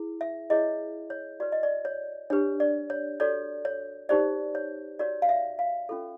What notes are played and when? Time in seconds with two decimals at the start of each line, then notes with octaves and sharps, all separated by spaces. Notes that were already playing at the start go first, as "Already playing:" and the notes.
Already playing: E4 G#4
0.21 E5
0.50 E4 G#4 C#5 D#5
1.10 C#5
1.40 F#4 B4 D5
1.52 D#5
1.63 D5
1.85 C#5
2.30 D4 G4 B4 C#5
2.60 D5
2.90 C#5
3.20 F#4 A4 C#5 D5
3.65 C#5
4.09 D#4 G4 C5 D5
4.55 C#5
4.99 F#4 A#4 C#5 D5
5.22 F5
5.29 E5
5.59 F5
5.89 C#4 F4 A4